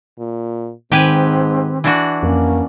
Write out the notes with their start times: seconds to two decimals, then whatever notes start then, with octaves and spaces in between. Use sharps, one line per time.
0.19 A#2
0.92 G#2 D#3 C4 G4 B4 G#5
1.84 E3 D4 F#4
2.23 F2 A#3 C#4